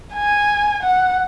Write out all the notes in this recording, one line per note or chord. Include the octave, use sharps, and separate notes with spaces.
G#5
F#5